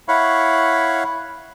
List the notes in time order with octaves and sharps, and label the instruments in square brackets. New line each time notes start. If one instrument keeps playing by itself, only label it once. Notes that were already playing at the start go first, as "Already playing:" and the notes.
[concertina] E4 C#5 F5 F#5 B5 C#6